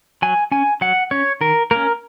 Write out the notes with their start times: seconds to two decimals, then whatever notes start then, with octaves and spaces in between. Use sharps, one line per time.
0.22 F#3 G#5
0.52 C#4 G#5
0.81 F#3 F#5
1.11 C#4 C#5
1.41 D#3 A#4
1.71 A#3 C#4 A#4